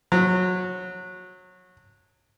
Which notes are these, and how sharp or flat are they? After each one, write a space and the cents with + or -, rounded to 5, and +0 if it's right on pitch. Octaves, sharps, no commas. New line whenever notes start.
F#3 -20